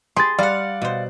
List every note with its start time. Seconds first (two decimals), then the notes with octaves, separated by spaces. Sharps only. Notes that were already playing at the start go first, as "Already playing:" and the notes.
0.16 G4 G#4 C6 A6
0.39 G3 D5 F5 F#5
0.82 B2 C5